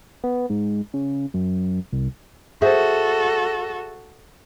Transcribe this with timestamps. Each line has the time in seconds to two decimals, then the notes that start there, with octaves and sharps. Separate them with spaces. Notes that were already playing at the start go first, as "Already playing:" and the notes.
0.24 B3
0.50 G#2
0.94 C#3
1.34 F#2
1.93 C2
2.62 F#4 G#4 A4 C5 E5